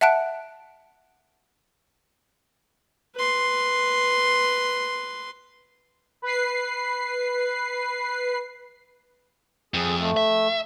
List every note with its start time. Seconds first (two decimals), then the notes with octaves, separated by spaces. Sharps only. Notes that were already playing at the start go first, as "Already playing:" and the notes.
0.01 E5 F#5 A5 F#6 D7
3.16 B4 C6
6.22 B4 C7
9.74 F2 G#4
9.99 A3
10.17 E5